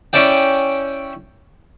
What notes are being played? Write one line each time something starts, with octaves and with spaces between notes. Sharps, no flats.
C#4 E4 D5 G5